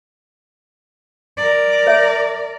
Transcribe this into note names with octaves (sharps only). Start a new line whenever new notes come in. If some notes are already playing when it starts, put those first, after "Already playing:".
A#4 D5
C#5 E5